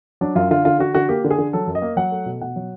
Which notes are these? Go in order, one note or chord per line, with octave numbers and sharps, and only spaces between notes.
F#3 D4
F#2 F4
D3 F4
D3 F4
D3 F#4
D3 F#4
A#3 G4
D3
G#4
D3
F#3 A4
F#2
D#5
A#3
F#3 F#5
A3
B2
B2 F#5
F#3